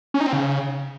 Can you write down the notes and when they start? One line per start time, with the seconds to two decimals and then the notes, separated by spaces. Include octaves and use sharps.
0.14 C#4
0.20 D#4
0.27 C4
0.33 C#3